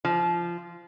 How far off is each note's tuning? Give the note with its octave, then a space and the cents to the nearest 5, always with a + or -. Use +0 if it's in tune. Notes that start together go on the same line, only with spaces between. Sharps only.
F3 -20